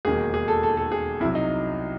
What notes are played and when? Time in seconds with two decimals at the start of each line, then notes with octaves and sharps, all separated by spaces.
0.05 E1 D#2 D#3 G#4
0.34 G#4
0.48 A4
0.63 A4
0.77 A4
0.92 G#4
1.20 C2 C3 F#3 E4
1.35 D#4